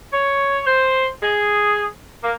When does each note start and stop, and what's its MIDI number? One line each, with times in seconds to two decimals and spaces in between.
0.12 0.60 73
0.67 1.07 72
1.23 1.86 68
2.24 2.32 58